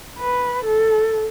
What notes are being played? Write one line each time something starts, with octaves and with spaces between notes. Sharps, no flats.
B4
A4